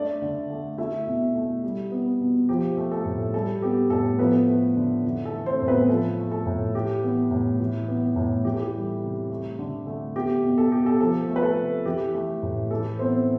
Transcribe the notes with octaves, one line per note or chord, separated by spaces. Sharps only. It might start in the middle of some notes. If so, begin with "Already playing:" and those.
Already playing: A3 D4 D5
D3
A3
A3 E4 E5
B2
A3
G3
B3
B2
F3 G4
A3
A4
A2
G3 A4
B3 G4
A2 A4
F3 B3 B4
A3
D3
E3
A4
A3
C4 C5
A2
B3 B4
F3 A4
A3
A4
A2
E3 G4
B3
A2
E3
B3
A2
E3 G4
A4
G4
G3
C3
A3
D3
A3
B3 G4
B2
A4
B3 G4
A4
F3 A4
A3
B4
A4
C3
E3 G4
A3
A2
E3 A4
B3 C4 C5